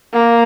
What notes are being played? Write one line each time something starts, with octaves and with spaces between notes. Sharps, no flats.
A#3